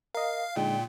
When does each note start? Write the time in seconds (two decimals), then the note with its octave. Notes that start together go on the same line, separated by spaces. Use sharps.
0.15 A#4 D#5 F5
0.56 A#2 D3 G#3 D#4 G5